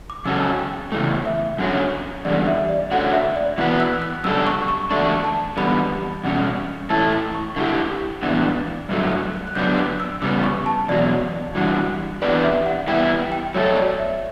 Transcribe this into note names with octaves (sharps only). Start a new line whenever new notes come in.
D6
C#3 F#3 C#4 F#4 A4 E6
G5
C#3 E3 A3
E5
F#2 D3 F#3 C#4
E2 D3 G3 D5
E5
D5
D3 A3 C#4 F#4 F#5
E5
D5
E3 B3 F#4 B4 F#5
E6
F#6
F#2 C#3 G3 D4 A4 E6
C#6
C#6
E2 D3 A3 D4 C#6
A5
E2 D3 G3 B3 B5
E2 B2 G3 C#4
A2 E3 A3 E4 A4 A5
A5
C#6
D3 A3 E4 G4
A2 E3 B3 D4
G2 D3 F#3 A3
F#6
F#6
F#6
F#2 D3 F#3 B3 D4 G6
F#6
E6
C#3 G3 B3 D6
C#6
A5
E2 B2 F#3 D5
E3 G3 D4 F#4
E3 B3 D4 G4 B4 D5
E5
F#5
E3 G3 B3 E4 G5
G5
F#3 A3 E4 A4 C#5
D5
E5